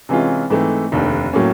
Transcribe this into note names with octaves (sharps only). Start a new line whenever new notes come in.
C3 E3 G#3 C#4 F4
G#2 E3 A3 C4
F1 D#2 D3
A2 F#3 A#3 C#4